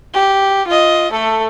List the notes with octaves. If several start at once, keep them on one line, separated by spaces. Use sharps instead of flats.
G4
F4 D#5
A3 A4